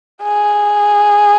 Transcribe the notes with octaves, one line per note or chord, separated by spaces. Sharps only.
G#4